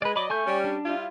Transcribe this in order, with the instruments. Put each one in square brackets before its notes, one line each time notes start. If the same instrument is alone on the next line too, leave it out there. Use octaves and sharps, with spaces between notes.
[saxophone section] G#3 [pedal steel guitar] B4 D5
[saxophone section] F#3 D5 D#5 [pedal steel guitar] B5 D6
[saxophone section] A3 [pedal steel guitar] G#5 C#6 G6
[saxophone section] G3 C#4
[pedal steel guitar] D4
[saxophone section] G3 E4 F4